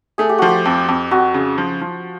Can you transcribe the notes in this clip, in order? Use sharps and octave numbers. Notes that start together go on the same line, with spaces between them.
A3 G#4
G4
F3 F#4
G4
F2
F2
F2 F#4
C#3
F3
F3